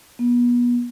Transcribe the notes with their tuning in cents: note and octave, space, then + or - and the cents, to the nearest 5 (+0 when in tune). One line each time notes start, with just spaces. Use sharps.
B3 -30